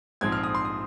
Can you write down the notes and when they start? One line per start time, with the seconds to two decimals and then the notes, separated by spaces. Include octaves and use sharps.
0.21 A#1 G#2 F3 C4 G#6
0.32 F6
0.43 D#6
0.55 C6
0.65 D#6